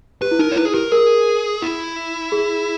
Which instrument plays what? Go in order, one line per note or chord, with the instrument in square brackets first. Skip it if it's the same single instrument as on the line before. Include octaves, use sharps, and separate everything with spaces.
[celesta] G4 [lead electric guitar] B4
[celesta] E4
[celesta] D#4 [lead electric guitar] A#4
[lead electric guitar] C#5
[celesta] E4 [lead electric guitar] B4
[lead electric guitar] G#4
[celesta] G4 [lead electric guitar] A#4
[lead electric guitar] G#4 [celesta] A#4
[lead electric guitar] E4
[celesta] G#4